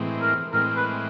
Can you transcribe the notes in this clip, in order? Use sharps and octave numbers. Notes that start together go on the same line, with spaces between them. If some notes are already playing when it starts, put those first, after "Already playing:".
Already playing: A2 E3 G#3 C4
A#4
A2 E3 G#3 C4 A#4
B4